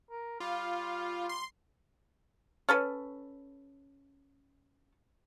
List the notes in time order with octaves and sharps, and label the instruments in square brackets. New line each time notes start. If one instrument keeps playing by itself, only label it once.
[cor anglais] A#4
[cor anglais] G3 [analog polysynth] F4
[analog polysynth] C6
[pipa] C#4 A4 B4